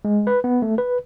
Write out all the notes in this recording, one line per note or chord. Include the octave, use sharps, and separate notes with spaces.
G#3
B4
B3
A3
B4